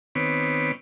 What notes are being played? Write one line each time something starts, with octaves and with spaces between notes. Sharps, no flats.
D#3 B3 C4 B4 C#5 D6